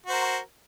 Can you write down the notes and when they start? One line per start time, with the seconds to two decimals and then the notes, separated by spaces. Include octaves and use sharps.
0.07 F#4
0.09 C5
0.12 A#4